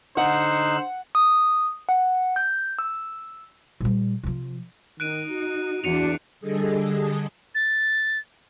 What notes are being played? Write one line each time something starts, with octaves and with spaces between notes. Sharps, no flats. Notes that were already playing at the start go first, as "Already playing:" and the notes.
D3 D#4 C5 F#5 E6 F#6
D#6
F#5
G6
E6
A#2 G3
C3 F3
D#3 D#4 F#6 D7 D#7
F#4
E2 D4 F#4 C#7 D#7 F7
D3 G3 G#4 A4 D#5
A6